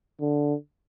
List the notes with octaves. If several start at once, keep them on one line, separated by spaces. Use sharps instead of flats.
D3